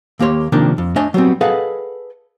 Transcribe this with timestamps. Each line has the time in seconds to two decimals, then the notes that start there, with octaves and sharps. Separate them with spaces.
0.19 D#2 A#3 G4 C#5 C6
0.52 C3 D#3 F3 A#3 D4
0.78 F2
0.96 A3 D4 C#5 D#5 G#5
1.14 F#3 G3 B3 C4
1.41 G#4 A4 B4 D#5 F5 F#5